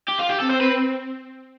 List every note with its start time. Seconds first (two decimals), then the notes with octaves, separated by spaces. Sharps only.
0.08 G4
0.19 F4
0.29 G4
0.39 C4 A4
0.50 C5
0.60 B4